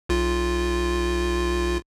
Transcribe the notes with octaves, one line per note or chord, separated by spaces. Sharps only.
B1 F4